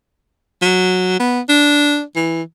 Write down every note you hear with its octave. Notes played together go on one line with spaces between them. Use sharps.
F#3
B3
D4
E3